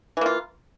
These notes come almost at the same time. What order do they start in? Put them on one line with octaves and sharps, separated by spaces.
E3 A#3 F4